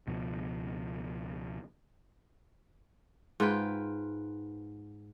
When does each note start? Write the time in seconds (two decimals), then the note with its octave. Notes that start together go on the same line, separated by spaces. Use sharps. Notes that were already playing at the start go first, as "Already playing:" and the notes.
0.07 C#2 B2 F3
3.40 G#2 F4 B4 G5